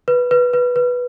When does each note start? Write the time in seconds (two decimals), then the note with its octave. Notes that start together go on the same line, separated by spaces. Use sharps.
0.08 B4
0.31 B4
0.53 B4
0.76 B4